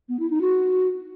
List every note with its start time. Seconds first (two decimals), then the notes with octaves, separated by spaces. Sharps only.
0.09 B3
0.19 E4
0.30 D#4
0.41 F#4